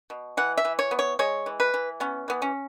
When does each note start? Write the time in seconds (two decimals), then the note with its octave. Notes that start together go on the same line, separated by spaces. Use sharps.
0.10 B2
0.37 E3 F#5
0.57 E5
0.65 E3
0.79 C#5
0.91 B3
0.99 C#5
1.19 G#3 C#5
1.46 E3
1.60 B4
1.74 E3
2.00 B3 C#4
2.28 E3 B3
2.42 C#4